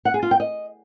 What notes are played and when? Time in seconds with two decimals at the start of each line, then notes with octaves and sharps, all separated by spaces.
0.05 F#5
0.14 G#4
0.23 F4
0.31 G5
0.40 D#5